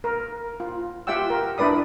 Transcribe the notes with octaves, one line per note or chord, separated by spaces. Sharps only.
A#4
F4
F4 G4 E5 F#5 G5 E6
A#4
D4 E4 B4 D5 D#6